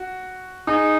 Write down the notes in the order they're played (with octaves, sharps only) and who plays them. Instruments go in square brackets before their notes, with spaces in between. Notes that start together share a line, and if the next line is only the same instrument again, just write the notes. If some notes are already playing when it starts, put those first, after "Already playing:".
Already playing: [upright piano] F#4
[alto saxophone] D#4 [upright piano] G#4